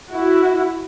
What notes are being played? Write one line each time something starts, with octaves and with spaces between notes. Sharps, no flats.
E4 F#4